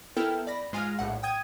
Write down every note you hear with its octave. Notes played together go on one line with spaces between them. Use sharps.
B3 E4 A4 A#4 G5 F6
D5 B5 A#6
G#2 G#3 F4 G#5 F6 A#6
A#1 A2 F#5
G5 D#6 G#6 D#7